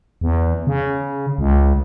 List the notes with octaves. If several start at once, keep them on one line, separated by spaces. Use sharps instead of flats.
E2
C#3
C#2